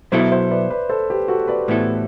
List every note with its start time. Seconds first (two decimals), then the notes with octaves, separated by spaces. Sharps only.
0.12 B2 F#3 B3 E4 A4 C5 E5
0.32 C5 E5
0.51 B4 D5
0.70 B4 D5
0.89 A4 C5
1.10 G4 B4
1.28 F#4 A4
1.48 B4 D5
1.68 A2 E3 B3 E4 A4